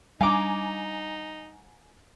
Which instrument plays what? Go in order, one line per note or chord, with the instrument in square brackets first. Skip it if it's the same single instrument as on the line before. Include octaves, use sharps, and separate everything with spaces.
[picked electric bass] G3 D4 [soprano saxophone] D#4 [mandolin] F5 F#5 D6 [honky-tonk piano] G#5 A#5